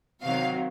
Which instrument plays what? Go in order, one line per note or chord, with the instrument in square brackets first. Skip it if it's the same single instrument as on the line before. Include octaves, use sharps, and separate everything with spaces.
[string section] C3 D#3 F#3 F5